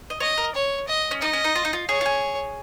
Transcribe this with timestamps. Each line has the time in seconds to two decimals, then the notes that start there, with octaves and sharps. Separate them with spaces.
0.10 D#5
0.20 C#5 D#5
0.38 A#4
0.55 C#5
0.88 D#5
1.11 C#4
1.21 D#4 D#5
1.33 C#4
1.44 D#4
1.55 F4
1.65 D#4
1.73 F4
1.89 G#4 C#5
2.01 F4
2.06 G#4